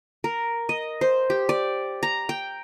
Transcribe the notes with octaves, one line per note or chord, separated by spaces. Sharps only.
A#4
D#5
C5
G4
D5
A#5
G5